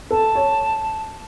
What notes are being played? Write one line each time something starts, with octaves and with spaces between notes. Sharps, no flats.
A4 A5
C#5